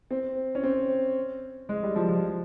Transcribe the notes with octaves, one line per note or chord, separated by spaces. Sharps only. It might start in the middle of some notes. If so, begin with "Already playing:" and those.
C4
C#4
C4
G#3
G3
F3
F3